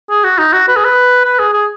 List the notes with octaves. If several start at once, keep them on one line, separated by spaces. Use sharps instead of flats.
G#4
F#4
D#4
F#4
B4
G#4
B4
B4
G#4
G#4